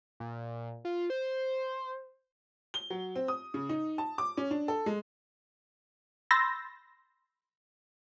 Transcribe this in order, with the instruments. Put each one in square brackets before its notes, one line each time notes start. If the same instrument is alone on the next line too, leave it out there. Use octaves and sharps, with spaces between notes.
[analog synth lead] A#2
F4
C5
[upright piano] G7
F#3
C4
D#6
C#3
D#4
A5
D6
C#4
D4
A4
G#3
[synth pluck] B5 C6 E6 G6 A6 A#6